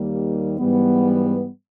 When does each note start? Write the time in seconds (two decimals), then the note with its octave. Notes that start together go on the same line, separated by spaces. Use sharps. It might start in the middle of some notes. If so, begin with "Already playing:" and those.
Already playing: D#2 D#3 G3 A#3
0.58 G#2 E3 G3 B3